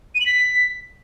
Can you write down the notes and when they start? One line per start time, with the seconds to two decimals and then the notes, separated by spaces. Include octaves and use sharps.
0.15 D#7
0.20 F#7
0.26 B6